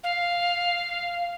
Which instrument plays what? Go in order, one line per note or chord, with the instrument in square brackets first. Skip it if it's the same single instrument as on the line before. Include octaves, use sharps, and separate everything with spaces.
[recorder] F5